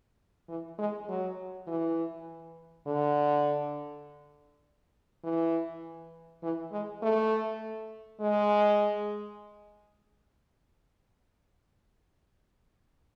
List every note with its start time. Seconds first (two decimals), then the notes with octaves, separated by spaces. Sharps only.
0.48 E3
0.79 G#3
1.09 F#3
1.67 E3
2.87 D3
5.24 E3
6.43 E3
6.72 G#3
7.02 A3
8.21 G#3